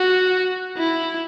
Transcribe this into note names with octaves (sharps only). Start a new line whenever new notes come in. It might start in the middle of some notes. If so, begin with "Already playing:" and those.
Already playing: F#4
E4